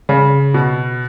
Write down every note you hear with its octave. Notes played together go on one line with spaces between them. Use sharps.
C#3
B2